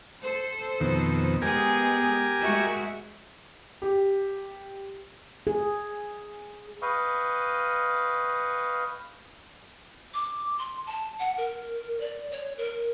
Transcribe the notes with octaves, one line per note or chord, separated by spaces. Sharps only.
A4 C5
F2 B2 D#3
G#3 B3 G4 G#4 A#4 G#5
G#3 F#4 E5
G4
G#4
B4 D#5 F5 G5 C#6
D6
C6
A5
F#5
A#4
D5
C#5
A#4